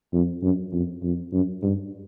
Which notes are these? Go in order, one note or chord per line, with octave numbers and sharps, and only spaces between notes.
F2
F#2
F2
F2
F#2
G2